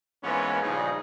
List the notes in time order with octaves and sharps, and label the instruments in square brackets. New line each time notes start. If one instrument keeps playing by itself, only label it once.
[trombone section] G#2 E3 A#3 B3 C#4
A#1 G2 C#3 D#4 G#4